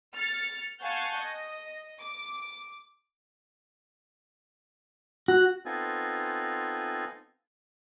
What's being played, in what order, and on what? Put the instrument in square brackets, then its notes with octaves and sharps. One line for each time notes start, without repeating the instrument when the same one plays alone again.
[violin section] F6 A6 C#7
F5 F#5 G#5 A5 C#6 G6
D#5
D6
[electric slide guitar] F#4
[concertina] B3 C4 D#4 F4 A4 G#5